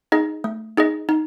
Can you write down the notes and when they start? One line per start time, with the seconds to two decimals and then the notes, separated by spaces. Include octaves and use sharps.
0.12 D#4 G#4 D#5
0.44 A3
0.77 D#4 G#4 D#5
1.09 D#4